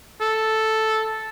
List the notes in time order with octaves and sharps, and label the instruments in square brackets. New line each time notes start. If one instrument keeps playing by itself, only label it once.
[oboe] A4